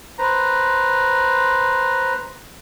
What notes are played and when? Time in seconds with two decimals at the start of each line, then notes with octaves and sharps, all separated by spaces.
0.18 B4 C5 A#5